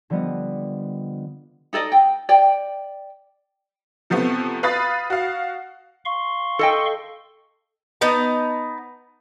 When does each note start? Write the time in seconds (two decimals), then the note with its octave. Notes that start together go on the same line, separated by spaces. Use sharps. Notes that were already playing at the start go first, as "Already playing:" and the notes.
0.10 D3 F3 G3 B3 D#5
1.73 D#4 A4 D5 D#5
1.92 G5
2.29 D5 G5
4.10 C3 F3 A3 B3
4.63 B4 F5 B5 D#6 A6
5.10 F#4 F5
6.05 F5 C6 C#6
6.59 A4 D#5 G5
8.01 B3 D#4 A5